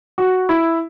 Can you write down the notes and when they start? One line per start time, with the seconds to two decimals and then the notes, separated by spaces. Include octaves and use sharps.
0.18 F#4
0.49 E4